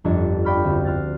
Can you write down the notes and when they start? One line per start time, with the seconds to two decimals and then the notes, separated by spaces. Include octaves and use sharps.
0.04 G1 F2 D4 A5 G#6 C#7
0.45 F4 D5 G5 B5 C#6 F6
0.65 D2 C4
0.85 C6 F6 F#6 A6